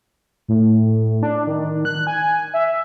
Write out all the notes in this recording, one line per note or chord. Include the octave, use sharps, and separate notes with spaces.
A2
D4
D#3
F#6
G#5
E5